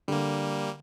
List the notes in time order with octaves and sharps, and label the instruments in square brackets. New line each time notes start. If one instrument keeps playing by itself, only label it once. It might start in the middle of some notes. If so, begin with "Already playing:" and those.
[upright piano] D3 [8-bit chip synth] G3 A#3